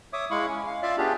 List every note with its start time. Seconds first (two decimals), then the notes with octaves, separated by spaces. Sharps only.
0.13 C#5 E5 D6 D#6
0.31 G#3 E4 F5 B5 C#6
0.48 C#4
0.67 F5
0.82 F4 D5 E5 F5
0.98 B3 C#4 D4 F4 G4 G#4